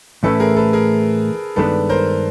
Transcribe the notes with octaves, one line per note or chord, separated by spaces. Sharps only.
A2 E3 A3 C#4 E4 A4 B4
G#4 A#4
A4 B4
G#4 A#4
G2 D#3 G#3 B3 D4 A4 B4
A#4 C5